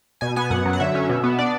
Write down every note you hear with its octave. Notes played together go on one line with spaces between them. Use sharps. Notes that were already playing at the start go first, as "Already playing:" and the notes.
B2 G#5
B3 G#5
F#2 F#5
F#3
F#5
D3 E5
C#4
B2
B3
D4 D5